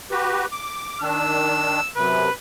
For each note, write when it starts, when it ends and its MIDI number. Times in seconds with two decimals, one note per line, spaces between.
0.11 0.46 66
0.11 0.46 67
0.11 0.46 71
0.51 1.00 86
1.01 1.80 51
1.01 1.80 62
1.01 1.89 88
1.96 2.30 42
1.96 2.30 48
1.96 2.32 71